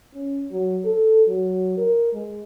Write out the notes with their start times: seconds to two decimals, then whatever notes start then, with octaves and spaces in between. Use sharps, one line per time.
0.14 C#4
0.51 F#3
0.85 A4
1.27 F#3
1.78 A#4
2.13 G#3